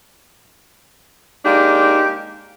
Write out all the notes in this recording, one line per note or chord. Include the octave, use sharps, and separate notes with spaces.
G#3 A#3 D4 D#4 G4